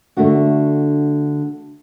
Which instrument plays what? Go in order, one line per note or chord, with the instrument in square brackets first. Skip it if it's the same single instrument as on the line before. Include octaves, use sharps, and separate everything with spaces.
[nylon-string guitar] D3 A3 D4 F#4